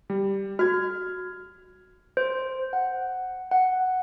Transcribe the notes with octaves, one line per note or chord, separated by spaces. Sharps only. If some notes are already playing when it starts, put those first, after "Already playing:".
G3
F#4 F6 G#6
C5
F#5
F#5